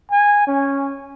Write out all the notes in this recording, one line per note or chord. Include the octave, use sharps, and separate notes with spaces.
G#5
C#4